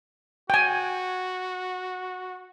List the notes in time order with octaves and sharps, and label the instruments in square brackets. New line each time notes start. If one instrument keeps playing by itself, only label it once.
[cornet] F#4 [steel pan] G5 G#5